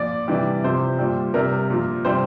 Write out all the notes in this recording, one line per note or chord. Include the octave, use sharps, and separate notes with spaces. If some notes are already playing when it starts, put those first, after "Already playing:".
Already playing: A#2 F3 D5
C3 E3 G3
C3 F3 C5
A#2 G3
C3 G3 A#4
A#2 F3
C3 G3 C5